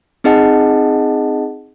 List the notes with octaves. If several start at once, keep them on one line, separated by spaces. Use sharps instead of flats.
C4 D#4 G#4 D#5 F#5 A5